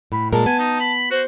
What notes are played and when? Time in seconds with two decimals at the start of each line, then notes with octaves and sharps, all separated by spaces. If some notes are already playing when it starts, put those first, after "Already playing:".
0.12 A2 B5
0.33 A#2 G#3 A#4 A5
0.46 B3 G#5
0.59 D#4
0.80 B5
1.11 F#4 C5